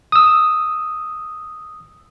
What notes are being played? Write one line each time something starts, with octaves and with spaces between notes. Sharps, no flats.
D#6 E6